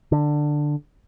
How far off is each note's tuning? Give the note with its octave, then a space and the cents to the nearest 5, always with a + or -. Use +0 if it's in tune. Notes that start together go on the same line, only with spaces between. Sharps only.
D3 +10